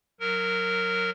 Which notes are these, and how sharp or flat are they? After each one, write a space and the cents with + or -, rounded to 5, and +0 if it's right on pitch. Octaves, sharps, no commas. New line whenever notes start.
F#3 -15 A#4 -10